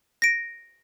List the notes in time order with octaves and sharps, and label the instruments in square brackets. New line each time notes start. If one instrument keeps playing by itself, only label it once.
[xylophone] A#6 D7